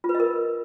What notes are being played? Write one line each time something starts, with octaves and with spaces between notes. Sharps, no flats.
F4
B4
D#5
A#4